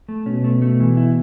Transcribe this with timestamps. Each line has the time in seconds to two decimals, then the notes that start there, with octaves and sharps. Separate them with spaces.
0.09 A3
0.26 B2 C#4
0.44 A3
0.62 A3
0.80 E3
0.97 E4